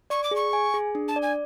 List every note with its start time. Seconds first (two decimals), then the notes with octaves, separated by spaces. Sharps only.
0.10 D5 C#6
0.24 D6
0.31 G#4 C#6
0.53 G#5
0.74 G#4
0.95 D4
1.08 A5
1.16 D5
1.22 G#5